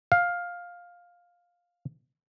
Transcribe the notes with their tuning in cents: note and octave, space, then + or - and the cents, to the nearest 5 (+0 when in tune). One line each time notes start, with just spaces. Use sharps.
F5 +10